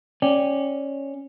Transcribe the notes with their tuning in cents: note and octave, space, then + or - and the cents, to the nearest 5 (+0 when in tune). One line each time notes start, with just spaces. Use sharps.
C#4 -10 D5 +0 G5 +0